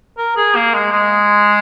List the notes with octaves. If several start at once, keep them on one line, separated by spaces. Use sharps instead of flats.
A#4
G#4
A#3
G#3
G#3